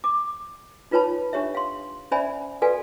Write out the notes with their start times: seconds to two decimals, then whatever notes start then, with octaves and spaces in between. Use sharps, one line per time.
0.04 D6
0.91 D#4 F4 B4 C#5 A5 B5
1.33 D4 G4 C#5 E5
1.55 F5 C6
2.11 C#4 C5 D5 E5 G#5 B5
2.62 F#4 A4 B4 D5 F5 G#5